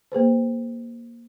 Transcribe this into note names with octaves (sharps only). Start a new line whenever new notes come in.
A#3 G#4 B4 C5